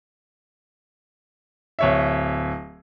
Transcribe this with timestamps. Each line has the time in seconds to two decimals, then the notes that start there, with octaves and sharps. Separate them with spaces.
1.79 D1 C#5 E5